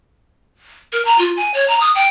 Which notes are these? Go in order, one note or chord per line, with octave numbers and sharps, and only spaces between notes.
A#4
A#5
F4
G#5
C#5
A#5
D#6
G5